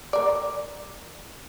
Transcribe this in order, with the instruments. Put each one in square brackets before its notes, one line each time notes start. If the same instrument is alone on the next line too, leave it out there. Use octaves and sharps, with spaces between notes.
[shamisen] A#4 D5